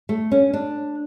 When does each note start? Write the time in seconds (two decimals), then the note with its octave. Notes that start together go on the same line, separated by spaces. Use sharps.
0.09 A3
0.32 C#4
0.54 D4